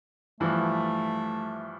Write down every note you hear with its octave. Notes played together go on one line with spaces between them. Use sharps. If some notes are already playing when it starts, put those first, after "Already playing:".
G2 E3 F3 A3